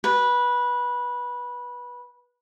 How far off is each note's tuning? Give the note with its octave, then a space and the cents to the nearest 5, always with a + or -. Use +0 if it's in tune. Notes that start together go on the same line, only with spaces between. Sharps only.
B4 -15